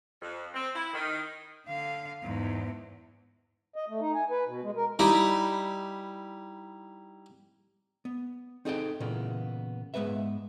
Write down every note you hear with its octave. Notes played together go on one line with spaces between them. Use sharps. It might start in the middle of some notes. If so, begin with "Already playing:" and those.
F2
C4
E4
D#3
D3 F5
E2 G#2
D#5
A3
D#4
G#5
B4
B2
G#3
A#4
G3 D#4 E4 D5
B3
C4 D#4 G#4 A4 D#5 G5
A#2 C#3 E3 A#3 B3
G#2 G#3 B3 B4 E5